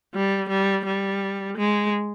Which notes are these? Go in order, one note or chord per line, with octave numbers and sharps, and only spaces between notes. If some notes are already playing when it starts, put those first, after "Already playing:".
G3
G3
G3
G#3